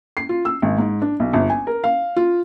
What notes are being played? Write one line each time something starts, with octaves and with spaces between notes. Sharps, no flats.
C7
F4
E6
G#1
G#2
D4
B1
G1
G#5
A#4
F5
F4